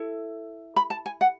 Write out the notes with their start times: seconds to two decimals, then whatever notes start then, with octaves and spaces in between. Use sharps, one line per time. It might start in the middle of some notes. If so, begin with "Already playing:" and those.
Already playing: E4 A4
0.76 B5
0.90 A5
1.06 G#5
1.21 F#5